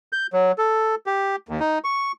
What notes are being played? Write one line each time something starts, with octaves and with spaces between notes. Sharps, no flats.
G6
F#3
A4
G4
D#2
D#4
C#6